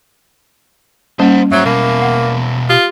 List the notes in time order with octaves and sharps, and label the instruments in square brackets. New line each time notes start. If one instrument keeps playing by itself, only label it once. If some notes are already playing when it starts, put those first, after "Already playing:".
[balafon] G3 A#3 C#4 [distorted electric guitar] C5 F#5
[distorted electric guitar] G#2 C5 [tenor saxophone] F#3 [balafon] E5
[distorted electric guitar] B2 E4 [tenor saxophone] A#3
[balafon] F#5
[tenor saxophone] F4 [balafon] G4